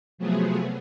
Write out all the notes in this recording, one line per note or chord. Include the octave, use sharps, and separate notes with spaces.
C3 F3 F#3 A3 B3 G#4